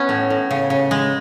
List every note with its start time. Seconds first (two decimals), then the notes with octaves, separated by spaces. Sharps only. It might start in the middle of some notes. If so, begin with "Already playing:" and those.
Already playing: B3 C#4
0.09 A2
0.30 A2
0.51 C#3
0.70 C#3
0.91 G#3